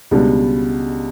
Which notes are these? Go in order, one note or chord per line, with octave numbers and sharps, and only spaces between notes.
C#2 B2 G3 B3 D4